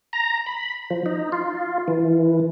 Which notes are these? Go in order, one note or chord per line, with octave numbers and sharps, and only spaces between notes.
A#5
B5
F3
D#4
F4
E3